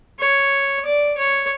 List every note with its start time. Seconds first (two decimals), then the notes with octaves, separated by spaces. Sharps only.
0.19 C#5
0.85 D5
1.18 C#5